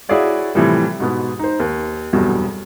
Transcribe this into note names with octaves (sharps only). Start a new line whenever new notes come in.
E4 F#4 G#4 C#5 D5 F5
A2 C3 E3 F3 G3
G#2 B2 B3
D#4 C5
D#2
F1 E2 G2 B2 F#3